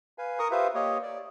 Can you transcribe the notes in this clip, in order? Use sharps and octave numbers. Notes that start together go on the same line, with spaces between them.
B4 F5 G#5
A#4 A#5 C#6 D#6
F4 G4 B4 C5 E5 F5
A#3 G4 C#5 D#5
D5